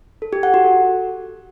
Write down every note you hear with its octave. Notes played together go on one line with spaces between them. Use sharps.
A4
G4
F#5
F#4
A4